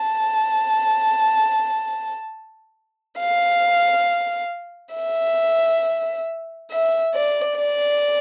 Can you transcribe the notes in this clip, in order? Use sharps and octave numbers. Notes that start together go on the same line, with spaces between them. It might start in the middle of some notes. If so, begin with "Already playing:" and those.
Already playing: A5
F5
E5
E5
D5
D5